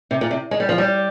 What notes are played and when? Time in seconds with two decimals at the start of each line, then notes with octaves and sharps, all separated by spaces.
0.11 C3
0.21 A#2
0.31 C3
0.51 G#3
0.60 G3
0.69 F3
0.78 G3